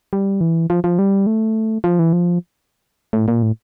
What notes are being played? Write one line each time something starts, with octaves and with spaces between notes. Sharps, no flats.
G3
E3
F3
F3
G3
A3
F3
E3
F3
A2
A#2
A2